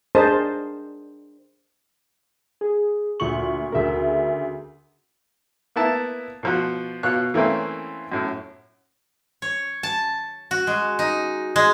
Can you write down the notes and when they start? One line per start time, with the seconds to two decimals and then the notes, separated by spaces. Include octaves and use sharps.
0.15 D4 G#4 A#4 C5 D#5 A5
2.61 G#4
3.20 D2 A#2 C#6 F#7
3.72 D2 C#3 A#4 E5
5.76 A#3 B3 E4 A5
6.43 B2 F3 F#4
7.03 B2 F4 C#5 F#6
7.34 E3 A3 A#3 C4 C#4
8.12 F#2 A2
9.42 C#5
9.83 A5
10.51 F#4
10.67 G#3
10.99 D#4
11.56 G#3